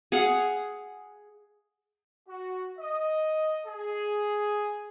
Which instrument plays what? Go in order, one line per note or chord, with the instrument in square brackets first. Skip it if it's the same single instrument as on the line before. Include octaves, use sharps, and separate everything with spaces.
[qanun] G#4 F5 F#5
[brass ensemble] F#4
D#5
G#4